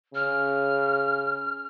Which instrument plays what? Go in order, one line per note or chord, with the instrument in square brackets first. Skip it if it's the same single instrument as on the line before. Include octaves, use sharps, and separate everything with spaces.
[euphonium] C#3 [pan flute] F6